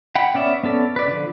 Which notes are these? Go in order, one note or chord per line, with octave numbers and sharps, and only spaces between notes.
F#5 G5 B5
B3 C#4 D5 E5
B3 C#4 A4 D5
B4 D5
D3 F3